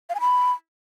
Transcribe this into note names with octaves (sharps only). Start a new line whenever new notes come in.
F5
G#5
B5